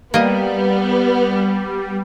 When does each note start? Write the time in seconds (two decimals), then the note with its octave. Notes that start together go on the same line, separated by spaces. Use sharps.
0.14 G3 A#3 B3 D#5